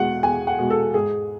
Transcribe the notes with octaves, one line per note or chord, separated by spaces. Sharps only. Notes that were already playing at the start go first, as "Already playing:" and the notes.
Already playing: E2 B2 G#3 F#5
E2 G#5
F#5
B2 G#3
A4
G#2 G#4